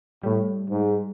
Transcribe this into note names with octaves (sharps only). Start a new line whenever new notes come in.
A2 G3
G#2